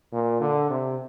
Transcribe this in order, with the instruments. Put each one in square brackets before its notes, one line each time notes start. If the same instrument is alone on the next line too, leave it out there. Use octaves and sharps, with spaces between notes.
[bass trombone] A#2
D3
C3